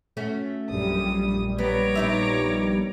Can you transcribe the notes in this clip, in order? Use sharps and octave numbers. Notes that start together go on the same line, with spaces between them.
A3 C#4 F#4
A#1 F#2 G3 D#6
B3 C#5 A#5 D6
B3 D#4 E5